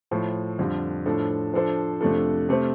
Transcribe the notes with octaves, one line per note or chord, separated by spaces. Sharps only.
A2 F3 A3
F2 D3 G3
A2 F3 D4 A4
F3 D4 A4 C5
F2 C3 A3 D4 A4
C3 A3 C4